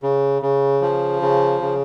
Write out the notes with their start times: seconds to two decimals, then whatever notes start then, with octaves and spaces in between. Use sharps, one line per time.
0.03 C#3
0.42 C#3
0.82 F3
1.22 C#3
1.61 C#3